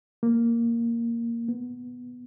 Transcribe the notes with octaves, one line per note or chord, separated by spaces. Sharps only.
A#3
B3